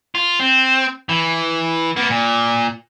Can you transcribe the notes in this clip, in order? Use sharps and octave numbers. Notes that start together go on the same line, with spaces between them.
F4
C4
E3
A#3 B3
A#2